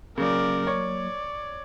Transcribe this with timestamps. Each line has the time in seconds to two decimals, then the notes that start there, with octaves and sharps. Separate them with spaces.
0.18 C#3 F#3 A#3 A#4 D5
0.67 C#5 D5